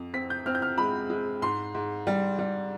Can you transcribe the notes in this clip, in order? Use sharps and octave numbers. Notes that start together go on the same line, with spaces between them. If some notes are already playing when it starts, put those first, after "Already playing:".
Already playing: F2
C4 B6
G6
C4 F6
G6
F6
G#3 B5
G#3
G#2 C6
G#2
G3
G3